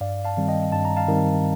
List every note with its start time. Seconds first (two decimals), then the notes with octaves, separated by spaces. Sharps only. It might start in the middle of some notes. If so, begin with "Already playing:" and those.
0.01 G2 D5 F5
0.25 F5 A5
0.37 D#3 G3 C4
0.49 D#5 G5
0.72 G2 A5
0.85 A#5
0.97 F5 A5
1.08 D#3 G3 C4